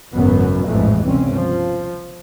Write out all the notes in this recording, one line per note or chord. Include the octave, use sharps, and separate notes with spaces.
G#1 F#2 C#3 F#3 B3
A1 F2 G#2 E3 G#3 A3
G1 C#2 C3 C4 C#4
F3